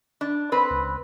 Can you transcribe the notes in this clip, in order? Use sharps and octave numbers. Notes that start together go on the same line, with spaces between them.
D4
C4 B4
C#2